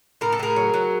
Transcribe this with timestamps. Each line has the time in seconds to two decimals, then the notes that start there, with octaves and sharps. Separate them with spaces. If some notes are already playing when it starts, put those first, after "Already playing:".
0.21 A2 A#4
0.32 A4
0.39 A2 G#4 A#4
0.56 F#3
0.74 F#3